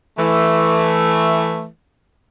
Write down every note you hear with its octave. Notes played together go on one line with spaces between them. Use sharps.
E3 A3